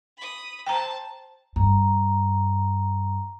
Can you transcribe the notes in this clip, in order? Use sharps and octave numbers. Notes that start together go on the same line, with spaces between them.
B5 D#6
C5 G5 A5 A#5
G2 A#5